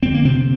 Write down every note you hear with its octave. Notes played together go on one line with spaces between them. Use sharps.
F2 D3 C4
A#3
C3 C4